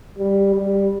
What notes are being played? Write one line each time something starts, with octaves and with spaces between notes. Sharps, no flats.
G3
G3